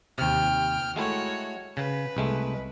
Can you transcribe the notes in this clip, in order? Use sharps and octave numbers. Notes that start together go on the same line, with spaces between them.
D#2 C3 G5 F6
G#3 A3 E4 F#4 C#5
C#3 B4
C2 G#3 A3